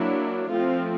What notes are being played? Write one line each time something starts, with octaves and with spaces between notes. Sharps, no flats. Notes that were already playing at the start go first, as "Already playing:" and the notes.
Already playing: F#3 A#3 D4 E4
F3 A3 C4 F4